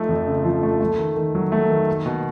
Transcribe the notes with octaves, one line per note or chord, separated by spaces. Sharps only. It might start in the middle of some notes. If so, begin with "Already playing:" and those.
Already playing: F3 A3 D#4
F2
C#3
F3
A3
A3
D#3
D#3
F#3
A3
D#3
A#3
B2